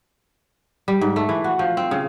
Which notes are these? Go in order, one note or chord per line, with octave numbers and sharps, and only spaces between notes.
G3
G#2
A3
E3
F#4
F3
C4
C#3